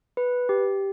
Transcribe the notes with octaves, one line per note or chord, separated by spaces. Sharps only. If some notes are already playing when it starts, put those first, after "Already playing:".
B4
G4